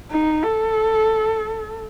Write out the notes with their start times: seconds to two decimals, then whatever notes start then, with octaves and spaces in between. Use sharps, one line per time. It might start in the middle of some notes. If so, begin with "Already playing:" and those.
0.11 D#4
0.43 A4